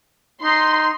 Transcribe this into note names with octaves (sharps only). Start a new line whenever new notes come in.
D#4 C6